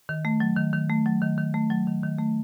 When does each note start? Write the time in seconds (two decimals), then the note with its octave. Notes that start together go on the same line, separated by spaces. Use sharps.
0.09 D#3
0.25 A3
0.40 F#3
0.57 D#3
0.73 D#3
0.90 A3
1.06 F#3
1.22 D#3
1.38 D#3
1.54 A3
1.70 F#3
1.87 D#3
2.03 D#3
2.19 A3